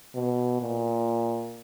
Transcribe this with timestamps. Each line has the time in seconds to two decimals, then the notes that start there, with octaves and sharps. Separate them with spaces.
0.15 B2
0.62 A#2